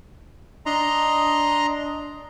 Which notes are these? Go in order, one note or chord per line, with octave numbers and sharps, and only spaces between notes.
D4 D#5 A#5 C6